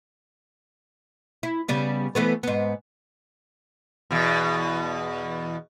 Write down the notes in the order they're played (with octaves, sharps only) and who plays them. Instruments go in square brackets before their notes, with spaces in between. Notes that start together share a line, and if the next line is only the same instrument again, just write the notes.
[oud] E4
C#3 G3 B3
E3 A3 B3
G#2 B3
[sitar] E2 B2